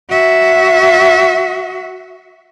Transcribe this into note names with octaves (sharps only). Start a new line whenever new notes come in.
F#4 E5